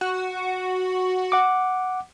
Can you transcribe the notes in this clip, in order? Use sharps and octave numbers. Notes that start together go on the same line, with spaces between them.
F#4
F#5 D6